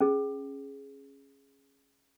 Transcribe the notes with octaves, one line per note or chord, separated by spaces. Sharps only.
C#4 G#4